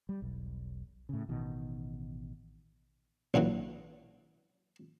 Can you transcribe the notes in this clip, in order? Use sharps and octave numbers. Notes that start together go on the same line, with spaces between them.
G3
E1 B1
A2 C#3
A1 B2 D#3
A#1 D3 E3 F#3